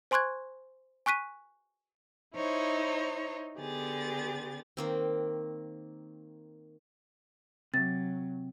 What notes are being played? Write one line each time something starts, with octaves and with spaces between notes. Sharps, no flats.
C5 G#5 C6 C#6 F#6 G#6
G#5 C#6 F#6 B6 D#7
D#4 E4 C5 C#5
D3 B3 G4 G#4 A6
D#3 A#3 C4
C3 F#3 A6